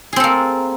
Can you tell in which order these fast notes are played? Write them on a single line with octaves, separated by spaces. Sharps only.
G#4 C4 A4 A#3